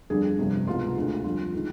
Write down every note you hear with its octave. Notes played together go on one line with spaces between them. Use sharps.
G1 F2 D3 G3 G#4
G1 F2 C3 G3
C2 B2 G#3 F4
D2 D3 G#3
F2 D3 G3 F4
D#3 G#3